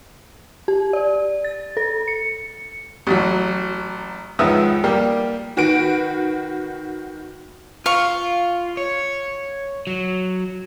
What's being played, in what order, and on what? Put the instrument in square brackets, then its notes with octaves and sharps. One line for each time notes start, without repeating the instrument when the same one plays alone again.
[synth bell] G4
D5
A6
A4
C#7
[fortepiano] A1 F#3
C#2 D#3 F3 B3 E5 D#6
G3 A#3 G4
[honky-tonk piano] D#3 F#4 B4 D7
[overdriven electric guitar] F4 [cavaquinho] F5 C#6
[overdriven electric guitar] C#5
F#3